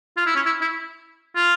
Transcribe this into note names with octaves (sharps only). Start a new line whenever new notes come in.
F4
E4
C#4
E4
E4
F4